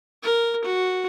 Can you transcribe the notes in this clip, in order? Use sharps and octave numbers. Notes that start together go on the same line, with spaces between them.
A#4
F#4